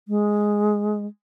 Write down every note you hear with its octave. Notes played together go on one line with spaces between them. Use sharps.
G#3